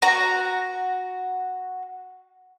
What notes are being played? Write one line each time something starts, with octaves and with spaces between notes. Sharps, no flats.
F#4 A#5